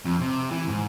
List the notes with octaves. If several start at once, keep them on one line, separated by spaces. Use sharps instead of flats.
F2
C3
E3
G#2